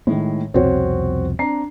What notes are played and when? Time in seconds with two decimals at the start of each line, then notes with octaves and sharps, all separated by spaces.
0.07 A2 D#3 G#3
0.54 C2 F2 B2 C4 F#4 C#5
1.39 C4 D4 A#5 C7